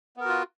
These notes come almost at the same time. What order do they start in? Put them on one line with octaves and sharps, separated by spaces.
B3 A#4 F#4 F4